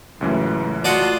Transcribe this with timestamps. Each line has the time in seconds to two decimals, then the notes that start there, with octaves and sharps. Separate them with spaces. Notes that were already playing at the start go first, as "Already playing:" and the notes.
0.21 C#2 F#2 A2 E3
0.84 A3 F4 F#4 D5 D#5 F#5 A5